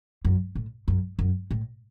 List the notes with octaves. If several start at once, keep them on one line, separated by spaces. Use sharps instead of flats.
F#2
A2
F#2
F#2
A2